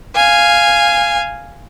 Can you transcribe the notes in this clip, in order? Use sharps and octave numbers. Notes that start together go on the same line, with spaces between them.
F5 G#5